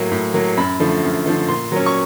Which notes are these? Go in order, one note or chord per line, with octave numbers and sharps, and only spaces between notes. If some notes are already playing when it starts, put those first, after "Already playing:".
Already playing: A2 F#3 A#3
A2
F#3 A#3
F#2 B5
D3 F3 A3
F#2
D3 F3 A3
A#2 C6
F#3 A#3 C#4
C#6